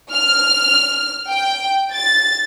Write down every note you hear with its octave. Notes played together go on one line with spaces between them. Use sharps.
F6
G5
A6